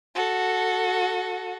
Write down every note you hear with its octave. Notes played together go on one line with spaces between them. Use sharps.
F#4 A4